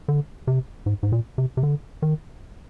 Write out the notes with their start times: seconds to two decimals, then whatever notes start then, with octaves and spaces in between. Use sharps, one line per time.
0.08 D3
0.47 C3
0.86 G#2
1.03 G#2
1.12 A#2
1.38 C3
1.57 C3
1.63 D3
2.02 D#3